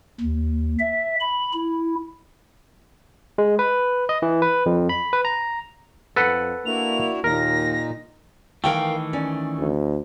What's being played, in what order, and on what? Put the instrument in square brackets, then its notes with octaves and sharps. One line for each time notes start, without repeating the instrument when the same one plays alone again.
[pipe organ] D#2
E5
B5
E4
[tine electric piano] G#3
B4
D#5
E3
B4
F2
B5
B4
A#5
[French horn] F2 [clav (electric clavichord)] A4 B4 F#5
[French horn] A#3 [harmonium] D4 E4 F#4 [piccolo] F7
[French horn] D#2 [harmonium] A#2 D#4 [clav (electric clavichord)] A#4 [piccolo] A#6
[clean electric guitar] D#3 E3 A3 [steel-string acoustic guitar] A#4 F5 G5
[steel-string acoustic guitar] C#4 D5
[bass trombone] D2